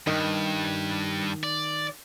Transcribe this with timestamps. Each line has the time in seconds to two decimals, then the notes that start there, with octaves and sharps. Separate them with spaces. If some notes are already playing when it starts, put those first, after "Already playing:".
0.07 G2 D#3
1.44 D5